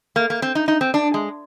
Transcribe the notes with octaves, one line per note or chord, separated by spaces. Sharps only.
A#3
A#3
C4
D#4
D#4
C4
D4
G#3